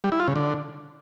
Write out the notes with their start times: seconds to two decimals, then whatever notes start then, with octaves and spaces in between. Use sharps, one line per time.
0.04 G3
0.12 E4
0.20 F4
0.28 C#3
0.36 D3